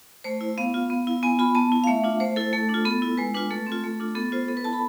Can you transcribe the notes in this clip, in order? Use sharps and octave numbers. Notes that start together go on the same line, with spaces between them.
A3 C5
E4
B3 F5
F4
B3
E4
B3 G#5
F4 B5
B3 A5
E4
F5
A3 E5
D4 F4
A3 C5
E4 A4
A3 A4
D4 F4
B3 A4
E4
G#3 B4
D4 F4 B4
A3 A4
C4
F4
A3
D4 F4
B3 A4
F4 C5
B3 A4
B4
E4 A5
B5